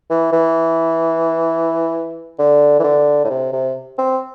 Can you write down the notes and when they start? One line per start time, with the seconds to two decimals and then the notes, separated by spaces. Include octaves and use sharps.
0.10 E3
0.32 E3
2.39 D3
2.80 E3
2.84 D3
3.24 A2
3.30 C3
3.53 C3
3.98 C4